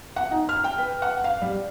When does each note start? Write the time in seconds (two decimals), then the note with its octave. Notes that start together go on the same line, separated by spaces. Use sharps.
0.16 F#5
0.31 D#4
0.49 F6
0.64 G5
0.78 B4
1.02 F#5
1.24 F5
1.42 G3